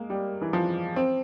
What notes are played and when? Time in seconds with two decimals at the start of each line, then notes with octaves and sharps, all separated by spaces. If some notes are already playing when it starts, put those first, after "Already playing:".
Already playing: G#3 A#3
0.10 G3
0.42 E3
0.53 F3
0.96 C4